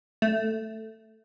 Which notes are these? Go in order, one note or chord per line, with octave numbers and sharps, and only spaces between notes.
A3